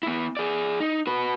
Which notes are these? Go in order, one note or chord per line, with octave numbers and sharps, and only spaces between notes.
B3 E4
G#4 D5
D#4
F#4 B4